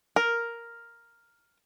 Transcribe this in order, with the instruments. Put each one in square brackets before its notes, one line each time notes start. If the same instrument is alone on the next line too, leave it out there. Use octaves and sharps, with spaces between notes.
[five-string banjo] A#4